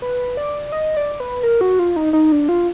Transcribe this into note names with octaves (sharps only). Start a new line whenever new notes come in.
B4
D5
D#5
D5
B4
A#4
F#4
F4
D#4
D#4
D4
F4